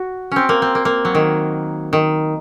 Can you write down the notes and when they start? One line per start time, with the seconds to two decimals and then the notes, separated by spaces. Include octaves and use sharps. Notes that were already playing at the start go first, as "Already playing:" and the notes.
Already playing: F#4
0.32 C4 C#4
0.49 A#3
0.62 C4
0.75 A#3
0.85 A#3
1.05 F#3
1.15 D#3
1.93 D#3